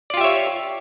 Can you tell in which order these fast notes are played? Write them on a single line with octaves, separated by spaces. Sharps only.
D5 F4 G4 E5 C#5